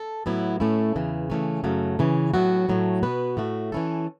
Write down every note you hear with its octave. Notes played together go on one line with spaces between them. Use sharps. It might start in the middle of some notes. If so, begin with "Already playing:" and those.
Already playing: A4
A2 F#3 B3 E4
A2 A3 C#4 E4 A4
E2 C#3 E3
C#3 E3 A3 C#4
F#2 C#3 F#3 A3
C#3 E3 C#4
A2 F#3 B3 F#4
A2 F#3 A3
B2 B3 F#4 B4
A2 A3 F#4
E3 C#4 E4 A4